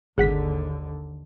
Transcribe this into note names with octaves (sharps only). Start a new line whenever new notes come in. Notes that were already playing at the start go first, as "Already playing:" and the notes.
G#1 D#2 D3 G#4 F#5 B6